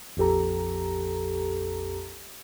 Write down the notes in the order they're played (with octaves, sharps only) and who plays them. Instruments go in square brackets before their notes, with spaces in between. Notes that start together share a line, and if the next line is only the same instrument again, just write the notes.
[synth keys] A#1 F2 G4 A4 A#5